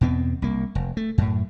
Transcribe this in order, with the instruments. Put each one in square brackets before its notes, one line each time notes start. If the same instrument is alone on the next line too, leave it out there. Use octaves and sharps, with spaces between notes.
[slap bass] E2 B2 B3 C4
C2 A#3
F1
A3
F#2 A2